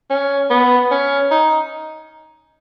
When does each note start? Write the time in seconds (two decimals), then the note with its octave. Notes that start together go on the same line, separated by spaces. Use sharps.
0.10 C#4
0.50 B3
0.91 C#4
1.31 D#4